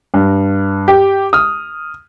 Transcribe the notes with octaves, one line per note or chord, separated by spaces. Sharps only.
G2
G4
D#6 F6